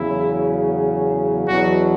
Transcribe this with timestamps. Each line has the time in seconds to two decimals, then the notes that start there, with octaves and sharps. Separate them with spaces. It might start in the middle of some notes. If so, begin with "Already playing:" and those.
Already playing: E2 C#3 F#3 E4
1.48 E2 B2 F#3 F#4